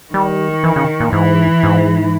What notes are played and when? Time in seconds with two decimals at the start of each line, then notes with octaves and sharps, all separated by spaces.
0.13 D#3 G3
0.64 E3
0.76 C#3
1.00 A#2
1.13 G#2 E3
1.63 G#2